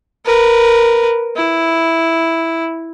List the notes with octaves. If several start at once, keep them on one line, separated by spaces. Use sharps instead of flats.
A#4 B4
E4